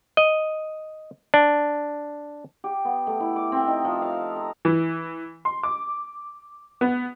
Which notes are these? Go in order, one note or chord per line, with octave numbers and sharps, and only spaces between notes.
D#5
D4
G4
B3
A3
E4
D6
C4
D#4
F3
F5
A#5
E3
C6
D6
B3